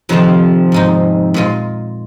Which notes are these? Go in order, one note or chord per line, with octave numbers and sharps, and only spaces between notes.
F2 C3 D#3 F3 C4 F4
G#2 G#3 D#4
A#2 G#3 F4